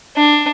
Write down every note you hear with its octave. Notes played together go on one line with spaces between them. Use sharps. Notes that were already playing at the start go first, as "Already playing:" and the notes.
D4